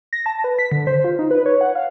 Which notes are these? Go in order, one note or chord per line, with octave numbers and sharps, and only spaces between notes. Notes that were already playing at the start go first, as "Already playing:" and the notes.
A#6
A5
B4
B6
D3
C5
F4
D#4
B4
C#5
F#5
F5